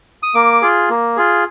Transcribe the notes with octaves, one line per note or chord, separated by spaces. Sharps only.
D#6
A#3 D6
F4 G#4
A#3
F4 G#4